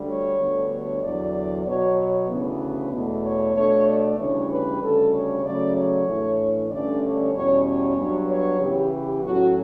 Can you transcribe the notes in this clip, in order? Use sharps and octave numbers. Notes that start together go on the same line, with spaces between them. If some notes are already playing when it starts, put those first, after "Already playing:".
Already playing: D2 D3 G3
C#5
D2 D3 G3 B3
C#5
E2 D3 F#3 D5
B2 F#3 B3 C#5
C#5
D2 C#3 E3 B3
E2 B2 A3
C#5
B2 A3 D4 C#5
D5
D2 C#3 E3 G3 D4 C#5
B4
D2 C#3 G3 A4
C#5
C#3 F#3 A3 C#4 D5
C#5
A2 E3 A3 D4
G2 D3 A3 C#4 D5
C#5
E2 B2 G3 C#4 C#5
C#5
G2 F#3 B3 D4
C#5
C#3 E3 B3 G4
G4
A2 F#3 A3 C#4 F#4